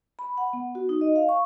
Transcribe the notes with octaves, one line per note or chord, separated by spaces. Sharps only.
B5
F#5
B3
F#4
D#4
D#5
F5
C#6